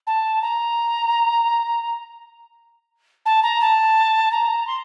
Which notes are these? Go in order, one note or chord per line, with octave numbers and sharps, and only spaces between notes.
A5
A#5
A5
A#5
A5
A#5
C6